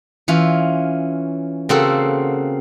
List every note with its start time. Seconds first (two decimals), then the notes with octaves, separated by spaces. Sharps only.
0.28 E3 C#4 F4
1.69 C#3 A#3 C4 F#4 A4